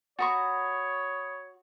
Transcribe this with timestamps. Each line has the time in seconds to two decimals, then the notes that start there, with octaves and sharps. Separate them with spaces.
0.19 F#4 C#5 A#5 B5 C#6 D#6 A6